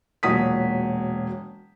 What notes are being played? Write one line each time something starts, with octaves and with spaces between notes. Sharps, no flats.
E1 A#2 F#3 D#6 B6